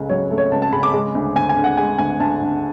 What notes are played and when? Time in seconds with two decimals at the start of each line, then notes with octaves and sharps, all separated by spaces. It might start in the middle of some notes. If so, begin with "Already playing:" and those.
Already playing: C#2 C#3 A3
0.09 F#3 C#5
0.31 A3
0.38 C#5
0.52 C#2 A5
0.62 A5
0.72 C#3 B5
0.83 D6
0.94 G#3
1.15 D2
1.35 D2 G#5
1.49 G#5
1.56 D3
1.64 F#5
1.77 G#3 G#5
1.98 D2 G#5
2.20 D2 A5
2.41 D3